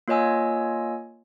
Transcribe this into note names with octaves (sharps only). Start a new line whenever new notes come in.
A#3 F4 C#5 D#5 G#5 E6